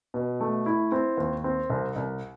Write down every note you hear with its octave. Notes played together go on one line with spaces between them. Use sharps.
B2
A3
E4
C4
D#2
C4
C2
C2